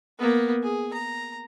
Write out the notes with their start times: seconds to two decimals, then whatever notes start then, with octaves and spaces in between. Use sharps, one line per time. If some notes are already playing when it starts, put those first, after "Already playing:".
0.19 A#3 B3
0.63 G#4
0.93 A#5